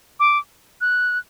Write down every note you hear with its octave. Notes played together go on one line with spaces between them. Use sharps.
D6
F#6